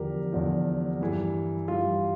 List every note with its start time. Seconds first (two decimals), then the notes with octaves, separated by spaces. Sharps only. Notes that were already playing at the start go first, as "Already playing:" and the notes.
Already playing: E2 D3 F3 G4 A#4
0.32 E2 D3 F3
1.01 G2 E3 G3
1.68 G2 E3 G3 F4